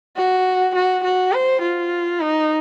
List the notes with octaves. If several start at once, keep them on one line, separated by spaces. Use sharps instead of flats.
F#4
F#4
F#4
C5
F4
D#4